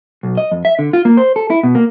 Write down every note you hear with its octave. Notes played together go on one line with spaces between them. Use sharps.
B1
D#5
F2
E5
D3
F4
A#3
C5
A4
E4
B2
A#3